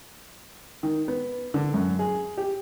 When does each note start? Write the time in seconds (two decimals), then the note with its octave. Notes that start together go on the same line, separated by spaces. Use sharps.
0.83 D#3
1.08 B3
1.54 D3
1.74 F#2
1.99 G#4
2.38 G4